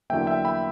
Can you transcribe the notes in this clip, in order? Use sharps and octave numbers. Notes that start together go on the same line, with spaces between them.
E2 D3 F#3 A#3 E5 G5
E5 G5
G5 B5